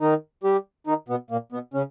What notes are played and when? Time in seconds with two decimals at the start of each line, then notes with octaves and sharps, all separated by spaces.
0.01 D#3 D#4
0.44 G3 G4
0.87 D#3 D#4
1.08 B2 B3
1.30 A#2 A#3
1.52 B2 B3
1.74 C#3 C#4